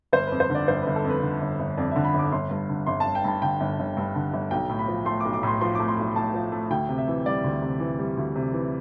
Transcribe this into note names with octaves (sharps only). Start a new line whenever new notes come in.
G1 C5
F2 B4
C5
D3 D5
G1 C5
B4
G1
A4
F2
B4
D3
G1
G1
F2 D5
D3 E5
B5
G1 D6
G1 C6
G2
D3
G1 C6
A5
G1
G5
G2 A5
D3 G5
G1
G1
G2
D3
G1
B1 G5
A2
B5
F3
A3 C6
D6
B1
D6
A2 C6
F3 C6
D6
A3
C6
B1
A2 A5
F3
A3
D2 G5
C3
E5
E3
G3 D5
D2
C3
E3
G3
D2
C3
E3